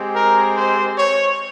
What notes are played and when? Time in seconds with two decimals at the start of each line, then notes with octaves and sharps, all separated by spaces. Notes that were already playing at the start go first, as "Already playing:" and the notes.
Already playing: G#3 C4 G4
0.14 A#4
0.55 C5
0.97 C#5